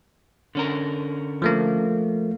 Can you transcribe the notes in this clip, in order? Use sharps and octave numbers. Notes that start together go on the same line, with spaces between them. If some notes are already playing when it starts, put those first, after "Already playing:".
D3 C#4 A#4
F3 A3 A#3